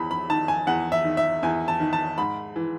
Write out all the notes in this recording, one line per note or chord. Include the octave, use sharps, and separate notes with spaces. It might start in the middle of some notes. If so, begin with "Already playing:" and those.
Already playing: E2 B5
B5
D#3 A5
G#5
E2 F#5
E5
D#3
E5
E2 G#5
A5
D#3
A5
G#2 B5
E3